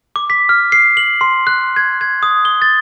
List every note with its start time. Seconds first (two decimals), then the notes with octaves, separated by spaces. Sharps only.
0.16 D6
0.30 B6
0.49 F6
0.72 C7
0.97 F#7
1.21 C6
1.47 F#6
1.76 G#6
2.01 G#6
2.23 D#6
2.45 G7
2.62 A6